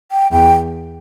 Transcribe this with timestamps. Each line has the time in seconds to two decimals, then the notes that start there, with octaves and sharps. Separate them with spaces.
0.12 G5
0.32 E2 G5